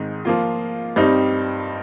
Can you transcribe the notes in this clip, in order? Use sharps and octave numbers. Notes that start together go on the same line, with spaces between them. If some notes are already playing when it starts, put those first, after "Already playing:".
Already playing: G#2 D#3 G#3 C4 D#4
F3 A#3 F4
G2 G3 C4 D#4